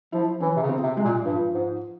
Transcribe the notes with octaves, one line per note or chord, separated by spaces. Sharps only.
F3 E4
E3 C#4
C3
C#3
C4
C3
G#3
A#2
G2 F3
G#2